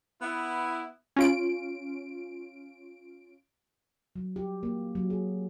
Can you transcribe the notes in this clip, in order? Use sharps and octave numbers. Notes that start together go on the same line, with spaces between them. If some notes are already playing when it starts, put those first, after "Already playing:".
B3 E4
C#4 F4 D7
F#3
G4
A#3
F#3
G#4